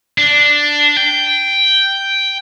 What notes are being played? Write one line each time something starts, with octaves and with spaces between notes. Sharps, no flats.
D4
G5